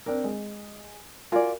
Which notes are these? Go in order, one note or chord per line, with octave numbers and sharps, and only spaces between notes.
C4 D4 A#4
G#3
F4 F#4 A#4 D5 G#5